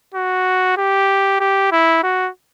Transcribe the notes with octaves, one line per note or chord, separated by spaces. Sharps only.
F#4
G4
G4
E4
F#4